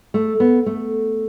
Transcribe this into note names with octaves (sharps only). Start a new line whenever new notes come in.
A3
B3
A3